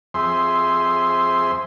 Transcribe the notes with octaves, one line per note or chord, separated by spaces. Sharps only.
F2 G#4 C5 E5 C6